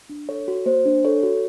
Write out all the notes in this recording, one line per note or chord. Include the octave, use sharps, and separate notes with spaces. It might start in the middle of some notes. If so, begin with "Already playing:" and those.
D4
A4 C#5
F#4
A#3 C5
D4
A4 C#5
F#4